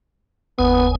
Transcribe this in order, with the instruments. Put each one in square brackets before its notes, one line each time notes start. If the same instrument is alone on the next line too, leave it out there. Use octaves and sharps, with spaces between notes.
[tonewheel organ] F#1 D#2 G#5 [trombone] B3